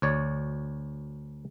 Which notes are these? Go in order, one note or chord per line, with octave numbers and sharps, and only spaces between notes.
D2 C#5 D5